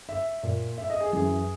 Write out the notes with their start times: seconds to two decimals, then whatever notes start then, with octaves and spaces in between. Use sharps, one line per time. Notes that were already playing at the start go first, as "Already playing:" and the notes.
0.09 E5
0.43 A#2
0.78 E5
0.90 D#5
1.01 G#4
1.12 F#2 E3 G#4